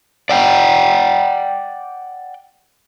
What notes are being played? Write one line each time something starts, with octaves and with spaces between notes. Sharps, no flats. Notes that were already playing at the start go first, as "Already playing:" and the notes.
D5 F#5 G5